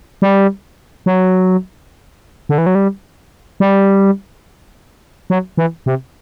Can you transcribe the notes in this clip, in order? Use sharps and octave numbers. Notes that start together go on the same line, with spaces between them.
G3
F#3
D3
E3
F#3
G3
G3
F#3
E3
C3